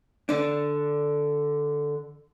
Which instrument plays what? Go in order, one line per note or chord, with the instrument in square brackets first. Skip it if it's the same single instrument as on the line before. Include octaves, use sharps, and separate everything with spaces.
[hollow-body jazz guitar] D3 D4